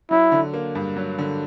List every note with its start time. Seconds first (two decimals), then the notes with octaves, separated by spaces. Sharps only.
0.11 F#3 E4
0.32 D3
0.53 A#3
0.75 G2
0.97 F#3
1.19 D3